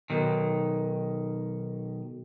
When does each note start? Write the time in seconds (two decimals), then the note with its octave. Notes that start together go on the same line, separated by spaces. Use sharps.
0.10 B1 D#3